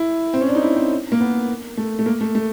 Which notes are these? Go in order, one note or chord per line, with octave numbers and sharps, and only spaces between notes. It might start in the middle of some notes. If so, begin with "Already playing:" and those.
Already playing: E4
C4
C#4
D4
D#4
E4
C4
A#3
B3
A3
A3
A#3
A3
A3